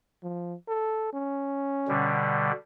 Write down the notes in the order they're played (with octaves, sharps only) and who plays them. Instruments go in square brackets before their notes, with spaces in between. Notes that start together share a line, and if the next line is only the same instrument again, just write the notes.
[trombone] F3
A4
C#4
[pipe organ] B2 D3 G3